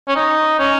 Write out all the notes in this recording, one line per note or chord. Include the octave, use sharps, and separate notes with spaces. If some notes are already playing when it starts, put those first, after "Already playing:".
C#4
D#4
C#4